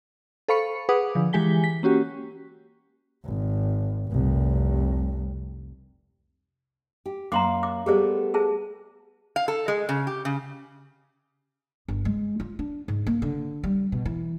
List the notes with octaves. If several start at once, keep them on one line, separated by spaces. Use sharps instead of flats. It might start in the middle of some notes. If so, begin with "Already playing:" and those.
A4 C5 F5 B5 C#6 C#7
G#4 B4 F#5 D6 D#6
D3 F3
E3 G#3 G4 G#5 B6 G7
B6
A#3 C#4 F#4 G4
G#1
F1 C2
G4
F#2 A#3 F5 A#5 C6 D6
D6
G3 A3 B3 G4 G#4 D5
G#4 A5
F5
A4
G#3
C#3
G4
C#3
G1
G#3
F4
D4
G#2
A#3
D3
G3
B2
E3